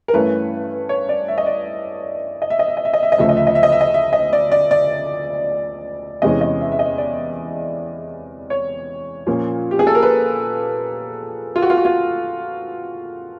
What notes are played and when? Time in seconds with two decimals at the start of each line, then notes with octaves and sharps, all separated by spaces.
0.08 A#4
0.13 G2 E3 A3 C#4 B4
0.89 C#5
1.09 D5
1.28 E5
1.38 D#5
1.46 D5
2.42 D#5
2.50 E5
2.59 D#5
2.68 E5
2.77 D#5
2.85 E5
2.94 D#5
3.03 E5
3.12 D#5
3.18 D2 C#3 F3 A3 E5
3.29 D#5
3.37 E5
3.47 D#5
3.55 E5
3.63 D#5
3.72 E5
3.81 D#5
3.94 E5
4.13 D#5
4.33 D5
4.52 D5
4.71 D5
6.22 E2 C3 E3 G#3 C#4 D#5
6.41 D#5
6.61 E5
6.72 E5
6.79 D#5
6.98 D5
8.50 C#5
9.27 A#2 F3 A#3 C#4
9.71 G4
9.79 G#4
9.87 A4
9.95 A#4
10.03 B4
11.56 F4
11.62 F#4
11.70 F4
11.77 F#4
11.85 F4